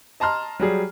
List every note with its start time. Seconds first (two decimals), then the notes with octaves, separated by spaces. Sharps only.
0.20 D#5 A5 A#5 C6 F6
0.59 F#3 G3 G#4